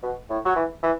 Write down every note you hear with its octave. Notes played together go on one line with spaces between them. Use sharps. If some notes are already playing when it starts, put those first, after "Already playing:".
B2
A2
F#3
E3
E3